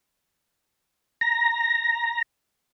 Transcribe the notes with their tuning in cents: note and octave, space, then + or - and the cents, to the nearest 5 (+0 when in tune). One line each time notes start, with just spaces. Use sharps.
A#5 +5